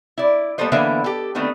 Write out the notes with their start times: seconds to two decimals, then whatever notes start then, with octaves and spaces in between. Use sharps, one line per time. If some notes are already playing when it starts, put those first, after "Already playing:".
0.18 E4 D5
0.58 G3 A#3 B3 A4 C5 D#5
0.72 D3 E3 A#3 B3 C5 E5
1.04 G4 A4
1.35 D3 D#3 A3 B3 C4